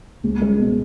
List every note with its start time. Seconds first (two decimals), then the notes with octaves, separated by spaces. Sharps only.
0.24 C#2
0.42 G#3
0.59 B2